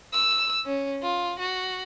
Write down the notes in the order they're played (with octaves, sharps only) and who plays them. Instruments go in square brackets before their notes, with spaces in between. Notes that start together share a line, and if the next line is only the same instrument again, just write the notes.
[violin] E6
C#4
F4
F#4